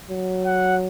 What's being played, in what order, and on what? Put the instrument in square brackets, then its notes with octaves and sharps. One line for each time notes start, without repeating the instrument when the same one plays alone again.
[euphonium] F#3
[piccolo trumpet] F#5